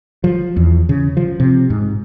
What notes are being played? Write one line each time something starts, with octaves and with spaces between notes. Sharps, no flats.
F3
E2
C#3
F3
C3
G#2